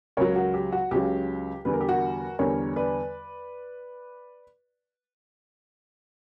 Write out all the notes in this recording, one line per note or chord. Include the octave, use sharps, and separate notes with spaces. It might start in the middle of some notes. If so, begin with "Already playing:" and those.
C#2 C#3 F#3 A#4 C#5
F#4 A#4
G4
F#4
C#2 C#3 F#3 G4
E2 D3 G3 B4
A#4
G4
F#4 A#4
E2 D3 G3 A#4 C#5
B4 D5